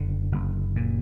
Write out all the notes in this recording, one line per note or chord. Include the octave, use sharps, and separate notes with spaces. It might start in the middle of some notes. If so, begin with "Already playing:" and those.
Already playing: F#1 D3
F#1
A#2